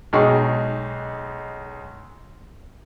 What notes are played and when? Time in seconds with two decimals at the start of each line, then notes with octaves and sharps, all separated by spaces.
0.13 B1 G#3 D#4 G#4 G5 C#6